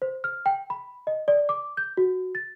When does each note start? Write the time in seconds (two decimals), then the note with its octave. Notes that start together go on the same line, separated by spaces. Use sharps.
0.02 C5
0.24 F6
0.46 G5
0.70 B5
1.07 D#5
1.28 D5
1.49 D6
1.77 G6
1.97 F#4
2.35 A6